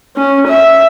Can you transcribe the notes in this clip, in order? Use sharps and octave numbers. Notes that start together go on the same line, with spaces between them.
C#4
E5